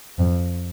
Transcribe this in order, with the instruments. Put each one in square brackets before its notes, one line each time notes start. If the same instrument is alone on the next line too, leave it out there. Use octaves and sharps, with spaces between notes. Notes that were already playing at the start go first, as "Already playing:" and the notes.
[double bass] F2